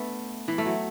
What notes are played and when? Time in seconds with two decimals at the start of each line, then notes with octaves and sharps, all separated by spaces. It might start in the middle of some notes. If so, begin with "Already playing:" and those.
Already playing: A3 B3 D4
0.48 E3
0.58 A3
0.65 F#3